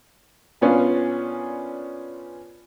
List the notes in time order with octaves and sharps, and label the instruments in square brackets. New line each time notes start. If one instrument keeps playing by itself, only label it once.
[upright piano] A#2 B3 C#4 D4 F4